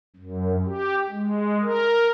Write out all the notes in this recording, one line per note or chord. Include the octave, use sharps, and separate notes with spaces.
F#2
G4
G#3
A#4